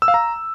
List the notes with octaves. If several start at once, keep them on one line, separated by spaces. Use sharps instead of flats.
E6
F5
A#5